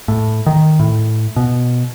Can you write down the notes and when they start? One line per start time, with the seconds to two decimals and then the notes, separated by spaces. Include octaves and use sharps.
0.08 A2
0.46 D#3
0.79 A2
1.36 B2